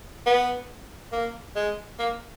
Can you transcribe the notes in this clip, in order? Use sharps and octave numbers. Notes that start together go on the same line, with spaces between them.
B3
A#3
G#3
A#3